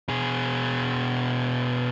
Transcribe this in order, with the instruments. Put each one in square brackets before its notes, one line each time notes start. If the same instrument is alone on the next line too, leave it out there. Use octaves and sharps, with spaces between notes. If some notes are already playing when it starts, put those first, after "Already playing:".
[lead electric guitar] B2 G#4